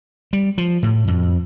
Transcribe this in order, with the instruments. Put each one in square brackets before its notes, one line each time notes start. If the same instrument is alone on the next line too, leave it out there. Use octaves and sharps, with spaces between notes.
[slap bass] G3
F3
A2
F2